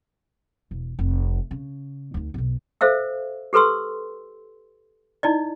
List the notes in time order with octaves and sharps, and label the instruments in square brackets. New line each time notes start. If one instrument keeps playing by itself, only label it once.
[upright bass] E1
F1
C#3
D2 D#4
B1 B2
[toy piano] A4 C5 E5 F5 E6
G4 A4 B4 C6 E6
D#4 E4 D5 D#5